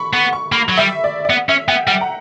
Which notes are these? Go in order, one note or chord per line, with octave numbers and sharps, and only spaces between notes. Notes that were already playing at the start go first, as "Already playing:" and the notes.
Already playing: B5 C#6
B3 C#6
C#6
A#3 B5
F#3
G3 E5
D5
D5
B3 E5
C#4 E5
B3 G5
G3 F#5
A#5